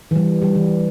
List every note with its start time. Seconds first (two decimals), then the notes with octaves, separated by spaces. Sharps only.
0.11 E3
0.16 G3
0.42 G3
0.55 E3